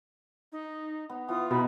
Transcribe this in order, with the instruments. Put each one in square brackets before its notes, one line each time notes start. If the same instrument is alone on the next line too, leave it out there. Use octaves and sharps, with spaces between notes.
[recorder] D#4
[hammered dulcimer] B3
[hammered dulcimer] E3 B3 [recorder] F4 [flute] D#6
[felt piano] B2 [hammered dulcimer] B3 D#4 [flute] B5